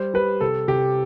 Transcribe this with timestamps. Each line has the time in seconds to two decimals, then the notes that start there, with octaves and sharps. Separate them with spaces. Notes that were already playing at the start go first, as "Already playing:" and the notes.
Already playing: G3 C5
0.14 G3 B4
0.41 C3 A4
0.68 C3 G4